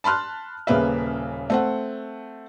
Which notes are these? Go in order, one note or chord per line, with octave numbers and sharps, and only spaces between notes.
A5 B5 C6 F6 F#6
D#1 C#3 A#3 B4 E5
A3 C4 F#5